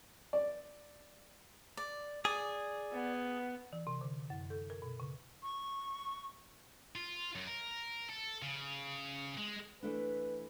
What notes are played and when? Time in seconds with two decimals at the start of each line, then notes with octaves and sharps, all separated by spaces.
0.33 D5
1.77 D5
2.25 G#4 D5
2.93 B3
3.73 E3
3.87 C3
4.01 D3
4.30 F#2
4.50 A4
4.70 A#4
4.82 B2
5.00 C#3
5.43 C#6
6.95 F4
7.36 F#2
7.47 A#4
8.09 A4
8.42 C#3
9.38 G#3
9.83 E3 A3 D4 B4